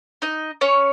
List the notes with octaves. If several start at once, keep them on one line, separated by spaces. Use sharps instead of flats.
D#4 D#5
C#4 C#5